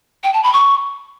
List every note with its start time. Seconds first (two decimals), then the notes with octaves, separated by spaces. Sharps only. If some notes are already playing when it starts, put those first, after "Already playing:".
0.24 G5
0.34 A5
0.43 B5
0.53 C#6